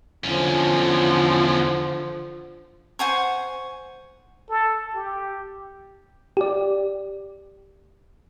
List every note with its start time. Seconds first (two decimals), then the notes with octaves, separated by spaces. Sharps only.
0.24 E2 D3 F3 C#4
2.99 C5 F#5 G#5 C#6
4.50 A4
4.95 G4
6.37 G4 D5